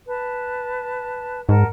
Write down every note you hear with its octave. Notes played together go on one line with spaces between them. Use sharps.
B4 A5
G#2 A#4 F#5 A5